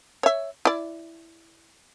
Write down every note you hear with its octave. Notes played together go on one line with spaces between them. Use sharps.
C#5 E5
E4 D5